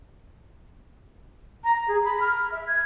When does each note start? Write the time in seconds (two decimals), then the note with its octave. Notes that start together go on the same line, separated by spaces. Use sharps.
1.63 A#5
1.87 G#4
2.04 B5
2.20 F6
2.51 E5
2.67 G#6